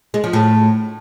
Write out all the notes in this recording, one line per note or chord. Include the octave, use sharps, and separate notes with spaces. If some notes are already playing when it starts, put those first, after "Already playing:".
G#3
F3
A2